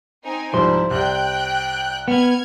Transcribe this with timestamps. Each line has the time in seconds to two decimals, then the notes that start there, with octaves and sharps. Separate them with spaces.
0.23 C4 D#4 G#5
0.54 C2 G#2 F3 E4 C5
0.91 C2 G5 F#6 G6
2.08 B3 F6 G#6